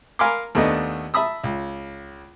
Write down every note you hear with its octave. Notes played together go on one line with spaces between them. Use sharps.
A#4 F5 G#5 B5 C6 D6
D#2 A3 B3 D4 D#5
E5 A5 B5 D#6 E6
C#2